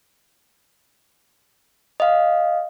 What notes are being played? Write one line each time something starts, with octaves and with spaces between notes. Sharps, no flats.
D#5 F5